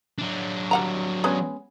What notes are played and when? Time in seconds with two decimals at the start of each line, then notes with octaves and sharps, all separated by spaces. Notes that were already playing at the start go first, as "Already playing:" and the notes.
0.18 F#3 D4
0.71 G3 F#5 A#5
1.24 G#3 B3 C#4